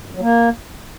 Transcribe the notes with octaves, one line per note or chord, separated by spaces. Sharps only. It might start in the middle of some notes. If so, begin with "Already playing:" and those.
G2
F#2
F#3
A#3